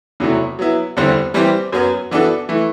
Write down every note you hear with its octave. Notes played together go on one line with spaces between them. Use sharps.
E2 C3 F#3 A3 E4
F#3 B3 E4
E2 D3 G3 C4 E4
E3 G3 C4 G4
F#2 F#3 B3
E3 B3 D4 F#4 A4
E3 A3